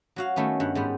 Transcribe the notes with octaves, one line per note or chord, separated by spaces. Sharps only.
F#3 F#4 F5
D#3 A3 B3 C#4
G2 F#5
G#2 G3 B3